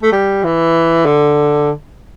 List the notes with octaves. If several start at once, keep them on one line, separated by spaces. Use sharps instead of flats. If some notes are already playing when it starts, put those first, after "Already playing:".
A3
G3
E3
D3